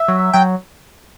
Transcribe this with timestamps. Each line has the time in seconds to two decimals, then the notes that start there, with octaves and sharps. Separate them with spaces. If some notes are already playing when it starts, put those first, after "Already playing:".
Already playing: E5
0.08 F#3
0.33 F#3 G5